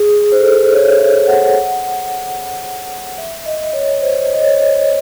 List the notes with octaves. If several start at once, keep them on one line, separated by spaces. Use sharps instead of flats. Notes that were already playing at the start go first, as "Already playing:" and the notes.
Already playing: G#4
C5
A4
C5
C#5
E5
F#5
E5
D#5
C#5
C5
D#5
C#5